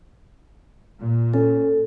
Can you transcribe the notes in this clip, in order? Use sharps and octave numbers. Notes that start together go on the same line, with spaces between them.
A#2
C#4 A4